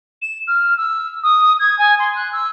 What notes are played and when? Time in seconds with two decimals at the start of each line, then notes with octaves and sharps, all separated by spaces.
0.21 E7
0.47 F6
0.77 E6
1.23 D#6
1.59 G#6
1.78 G#5
1.99 C6
2.15 F#6
2.32 E6